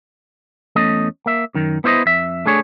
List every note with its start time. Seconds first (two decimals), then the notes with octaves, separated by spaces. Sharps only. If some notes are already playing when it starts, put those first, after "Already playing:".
0.76 E2 A3 C#4 D#5
1.26 A#3 E5
1.55 F#2 D#3
1.84 B3 E4 C5 D5 D#5
2.06 F2 E5
2.46 A3 D4 G#4 C#5